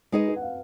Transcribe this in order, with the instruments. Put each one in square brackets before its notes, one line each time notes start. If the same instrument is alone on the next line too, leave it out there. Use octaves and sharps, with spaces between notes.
[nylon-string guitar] G#3 D#4 G#4 D#5 [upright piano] B4
[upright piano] B4
F#5
F5